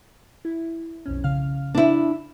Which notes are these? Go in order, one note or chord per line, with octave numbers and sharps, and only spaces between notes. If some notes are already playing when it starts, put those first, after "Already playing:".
E4
B1 F2 C#4
C#3 F5 F6
D4 E4